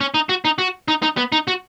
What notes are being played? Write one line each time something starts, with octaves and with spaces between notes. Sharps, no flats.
C#4
D#4
F#4
D#4
F#4
D#4
D#4
B3
D#4
F#4